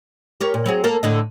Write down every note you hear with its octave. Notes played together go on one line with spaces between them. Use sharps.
G4 A#4 C#5
A#2
F#3 C4 G#4
A#3 A4 A#4
A2 D3 D#5